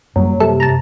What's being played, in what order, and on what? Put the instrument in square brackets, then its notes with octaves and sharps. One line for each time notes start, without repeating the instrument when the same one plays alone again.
[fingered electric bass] F#2 G3 A#3 [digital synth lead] F#3
[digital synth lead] C3 [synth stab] A4
[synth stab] A5 A#5